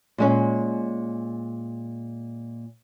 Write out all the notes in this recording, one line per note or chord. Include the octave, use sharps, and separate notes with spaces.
A#2 G#3 C#4